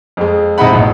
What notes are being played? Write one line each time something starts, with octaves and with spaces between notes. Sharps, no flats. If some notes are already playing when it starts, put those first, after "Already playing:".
F2 G#3
C3 G#3 D#4 E4 F#5 B5
E1 A1